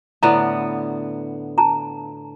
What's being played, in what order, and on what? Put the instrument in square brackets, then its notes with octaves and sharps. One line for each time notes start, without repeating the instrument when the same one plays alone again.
[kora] A2 D3 B3 [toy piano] A#5
[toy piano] A5 A#5